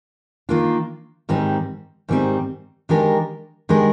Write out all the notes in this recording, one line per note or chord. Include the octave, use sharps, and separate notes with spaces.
D#3 A#3 D4 F4
G#2 D#3 G3 C4 G4
G#2 D#3 G3 C4 G4
D#3 G#3 D4 G4 A#4
D#3 G#3 D4 G4 A#4